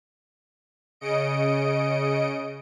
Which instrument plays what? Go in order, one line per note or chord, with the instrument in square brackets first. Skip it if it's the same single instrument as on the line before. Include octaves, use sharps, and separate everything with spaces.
[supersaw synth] C#3 D#5 C#7 D7